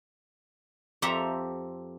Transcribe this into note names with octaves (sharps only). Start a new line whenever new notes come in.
F2 C4 G4 A4 E5 A#5